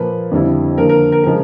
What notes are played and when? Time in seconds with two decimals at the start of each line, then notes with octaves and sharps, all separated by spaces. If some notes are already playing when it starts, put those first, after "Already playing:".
Already playing: A#2 F3 A#3 B4
0.31 F2 D3 G3 C4 E4
0.78 D3 F3 A#3 A#4
0.89 A#4
1.12 A#4
1.24 C#3 F3 G#3 A#4